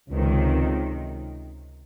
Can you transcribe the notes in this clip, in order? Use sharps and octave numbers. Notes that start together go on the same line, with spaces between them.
C#2 C3 D#3